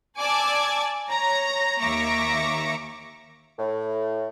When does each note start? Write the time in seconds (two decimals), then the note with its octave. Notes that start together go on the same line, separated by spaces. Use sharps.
0.18 D5 G#5 A5 D6 E6 G#6
1.10 C#5 A#5
1.81 D#2 A#3 E5 A#5 C#6 D6
3.59 A2